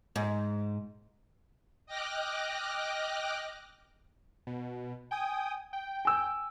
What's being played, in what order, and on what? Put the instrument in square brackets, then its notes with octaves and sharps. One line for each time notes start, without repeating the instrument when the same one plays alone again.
[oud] G#2
[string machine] D#5 G5 D6 F6 F#6 A#6
[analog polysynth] B2
G5 G#5 D#6
G5
[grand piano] G#5 E6